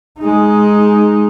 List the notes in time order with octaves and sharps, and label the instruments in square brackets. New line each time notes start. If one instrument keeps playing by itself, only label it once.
[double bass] G#3 D#4